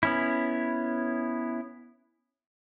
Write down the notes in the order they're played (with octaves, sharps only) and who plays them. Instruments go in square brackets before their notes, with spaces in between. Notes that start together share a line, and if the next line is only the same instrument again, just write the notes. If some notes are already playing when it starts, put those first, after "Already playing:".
[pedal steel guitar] B3 C#4 E4